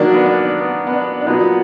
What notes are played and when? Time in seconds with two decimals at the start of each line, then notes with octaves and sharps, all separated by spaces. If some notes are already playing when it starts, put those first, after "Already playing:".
Already playing: D#3 F#3 A#3 D4
0.14 B3
0.25 D4
0.59 B3
0.87 B3
0.93 D4
1.21 D4
1.26 A#2 F#3 A#3 B3 D#4